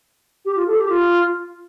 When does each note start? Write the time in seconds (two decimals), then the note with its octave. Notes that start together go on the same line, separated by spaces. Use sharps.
0.45 G4
0.56 F4
0.67 A4
0.78 G4
0.89 F4